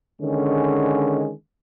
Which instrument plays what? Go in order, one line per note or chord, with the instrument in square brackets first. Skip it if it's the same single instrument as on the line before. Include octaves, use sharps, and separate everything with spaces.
[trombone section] D3 D#3 G#3 C#4